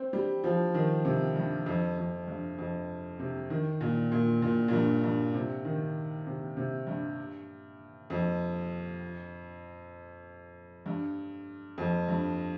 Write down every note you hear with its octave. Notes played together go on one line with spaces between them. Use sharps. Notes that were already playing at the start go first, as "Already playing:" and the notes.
Already playing: C4
G3
F3
D#3
C3
G2
F2
F2
G2
F2
C3
D#3
A#2
A#2
A#2
A#2
G2
G2
C3
D#3
C3
C3
G2
F2
G2
F2
G2